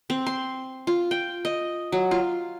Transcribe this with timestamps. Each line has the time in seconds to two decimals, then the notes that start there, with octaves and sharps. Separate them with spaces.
0.10 C4
0.26 C6
0.87 F4
1.11 G5
1.45 D#5
1.92 F#3
2.11 F4